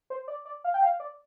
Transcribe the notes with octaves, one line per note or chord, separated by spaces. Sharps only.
C5
D5
D5
F5
G5
F5
D5